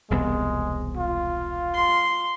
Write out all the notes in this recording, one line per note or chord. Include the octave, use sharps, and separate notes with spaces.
E1 C2 G#3 B3
F4
C6